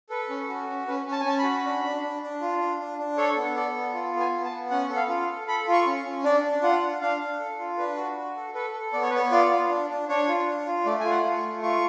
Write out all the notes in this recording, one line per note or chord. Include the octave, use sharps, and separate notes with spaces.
A4 B4
C#4
F#4
C#4
C#4 B4
C#4
A5
G#5
C#4 A5
B5
F#4
D4
D4
D4
D4
F4
D4
D4
D4
A4 C#5
B3
A4 D5
B3
F4
B3
G#5
B3
A5
B3
C#4 F#5
A4
F5
F4
F5
A4
A4 B5
F4
C#6
C#4
C#4
D4 D5
D4
F4 F#5
D4
D4 F5
D4
A4
F4
D4 B4
F#4
F#4
A4
A4 B4
A4
B3 D5
C#5
B3 B4
C#5
F4 D5
F4
D4
D4
D4 C#5
F4
D4
F4
A3 D5
F4 G#5
F#5
F4
C#6
A3
F4 C#6